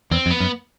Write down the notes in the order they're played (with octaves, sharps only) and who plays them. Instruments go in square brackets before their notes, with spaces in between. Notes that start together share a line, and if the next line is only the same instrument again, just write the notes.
[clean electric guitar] E2 [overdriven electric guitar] C4
[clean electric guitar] F2
[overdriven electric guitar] B3
[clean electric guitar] F#2